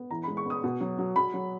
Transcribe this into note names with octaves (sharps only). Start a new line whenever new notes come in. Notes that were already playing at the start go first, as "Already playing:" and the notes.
Already playing: B3
E3 A#5
B5
G#3
C#6
B3
D#6
B2
F#3
F#3
F#3 B5
F#3